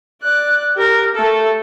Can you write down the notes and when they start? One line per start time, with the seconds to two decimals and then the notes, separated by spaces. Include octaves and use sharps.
0.22 D5 F#6
0.76 G4 A#4
1.15 A3 A4